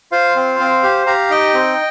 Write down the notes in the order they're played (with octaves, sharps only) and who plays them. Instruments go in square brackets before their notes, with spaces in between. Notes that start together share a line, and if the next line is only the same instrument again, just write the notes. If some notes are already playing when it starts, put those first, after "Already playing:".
[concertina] F4 C5 F5
C4
C4
G4
G4 F5 A#5
D#4 D#5 G5
C4